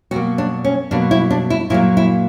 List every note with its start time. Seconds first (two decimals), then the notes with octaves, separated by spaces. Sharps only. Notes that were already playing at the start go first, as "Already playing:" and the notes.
0.11 B2 F#3 A#3 F#4
0.38 D4
0.64 C#4
0.91 B2 F#3 A#3 D4
1.11 E4
1.31 D4
1.50 E4
1.70 A#2 F#3 A#3 E4
1.97 E4